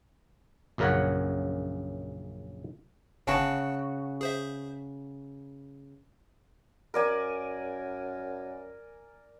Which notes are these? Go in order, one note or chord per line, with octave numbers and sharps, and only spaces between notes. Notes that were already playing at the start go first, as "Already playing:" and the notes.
A#1 F#2 C#3 A#4 C#5 F#5
G1 C#3 F#4 G5 A5
G#4 C5 E5
F#2 A#4 D5 G#5